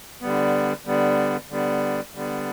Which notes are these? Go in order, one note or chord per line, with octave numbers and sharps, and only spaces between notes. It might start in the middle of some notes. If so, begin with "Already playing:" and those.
D3 G3 B3
D3 G3 B3
D3 G3 B3
D3 G3 B3